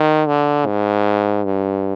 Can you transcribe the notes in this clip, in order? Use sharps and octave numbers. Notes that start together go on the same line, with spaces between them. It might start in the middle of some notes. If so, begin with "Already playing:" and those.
Already playing: D#3
D3
G#2
G2